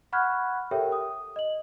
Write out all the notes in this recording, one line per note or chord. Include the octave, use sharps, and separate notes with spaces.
F#5 B5 C#6 F6 F#6 G#6
G4 A4 A#4 C#5 E5 G5
D#6
D#5 F#7